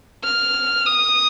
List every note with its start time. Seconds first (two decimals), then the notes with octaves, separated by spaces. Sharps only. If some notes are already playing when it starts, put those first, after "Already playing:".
0.24 F6
0.86 D#6